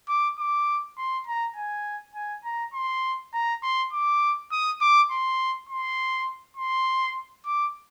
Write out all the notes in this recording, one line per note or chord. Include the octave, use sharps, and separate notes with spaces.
D6
D6
C6
A#5
G#5
G#5
A#5
C6
A#5
C6
D6
D#6
D6
C6
C6
C6
D6